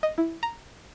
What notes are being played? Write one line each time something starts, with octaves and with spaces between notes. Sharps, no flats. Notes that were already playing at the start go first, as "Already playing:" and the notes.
D#5
E4
A#5